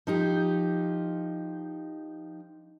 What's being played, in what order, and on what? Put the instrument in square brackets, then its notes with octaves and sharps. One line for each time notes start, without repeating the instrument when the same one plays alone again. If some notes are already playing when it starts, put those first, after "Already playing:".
[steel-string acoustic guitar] F3 D#4 G4